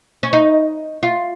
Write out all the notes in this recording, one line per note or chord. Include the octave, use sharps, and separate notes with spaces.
C#4
D#4
F4